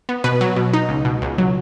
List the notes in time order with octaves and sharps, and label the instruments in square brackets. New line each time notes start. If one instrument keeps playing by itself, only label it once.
[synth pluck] B3
B2 B4
F#3
B2
D#4
C#2
B2
C#2
F#3